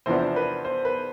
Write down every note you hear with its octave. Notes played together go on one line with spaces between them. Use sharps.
E2 C3 F3 B3 D4 C5
B4
C5
B4